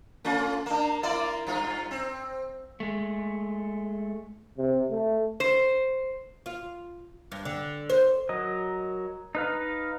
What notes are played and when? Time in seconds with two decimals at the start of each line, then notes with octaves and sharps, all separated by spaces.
0.25 A3 C#4 F4
0.66 A#3 D4
1.03 A#3 E4 D5
1.47 G2 F4
1.91 C4
2.80 G#3 A3
4.58 C3
4.91 A3
5.40 C5
6.46 F4
7.32 G2
7.45 D3
7.90 C5
8.29 F#3 A#4 D#5
9.35 D#4 B4 F5